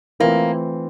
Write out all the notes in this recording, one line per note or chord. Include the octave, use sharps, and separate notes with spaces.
E3 A3 A#3 C4 F4